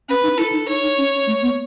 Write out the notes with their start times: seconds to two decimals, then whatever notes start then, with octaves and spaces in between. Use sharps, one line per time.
0.09 C#4 B4
0.23 D#4
0.38 E4 A4
0.52 D#4
0.68 D#4 C#5
0.82 D#4
0.98 C#4
1.27 A3
1.42 B3